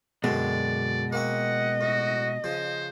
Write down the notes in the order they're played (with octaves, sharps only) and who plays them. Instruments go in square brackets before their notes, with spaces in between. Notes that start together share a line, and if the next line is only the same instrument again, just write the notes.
[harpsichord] F#2 D3 C4 [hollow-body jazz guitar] B2 G#3 [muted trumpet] D5
[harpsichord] A#3 C4 C#6 [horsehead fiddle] D#5 [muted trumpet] F#5
[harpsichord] A2 [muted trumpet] F#4
[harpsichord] C#3 F3 [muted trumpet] C5